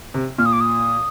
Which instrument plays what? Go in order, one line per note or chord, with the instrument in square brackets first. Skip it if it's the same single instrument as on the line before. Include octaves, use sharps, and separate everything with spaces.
[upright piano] C3
[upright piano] A#2 [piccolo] F6
[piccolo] D#6
D6
D#6